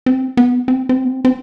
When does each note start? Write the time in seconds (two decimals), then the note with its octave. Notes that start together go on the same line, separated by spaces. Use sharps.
0.06 C4
0.37 B3
0.68 C4
0.89 C4
1.05 B3
1.09 C4
1.25 C4